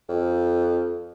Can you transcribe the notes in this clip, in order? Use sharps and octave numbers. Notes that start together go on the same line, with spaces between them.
F2